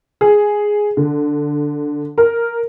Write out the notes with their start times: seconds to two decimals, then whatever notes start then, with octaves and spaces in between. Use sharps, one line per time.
0.21 G#4
0.97 D3
2.18 A#4